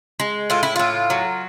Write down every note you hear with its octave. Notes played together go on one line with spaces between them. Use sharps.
G#3
A2 F4
E4
A2 F4
F#3